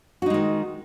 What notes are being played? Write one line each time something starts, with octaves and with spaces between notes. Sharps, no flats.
D#3 G#3 D#4 F#4